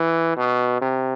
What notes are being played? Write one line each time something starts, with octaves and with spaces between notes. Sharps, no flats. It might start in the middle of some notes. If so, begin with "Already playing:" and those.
Already playing: E3
B2
C3